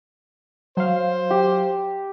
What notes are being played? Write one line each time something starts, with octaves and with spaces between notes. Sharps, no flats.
F#3 C5 F5
G4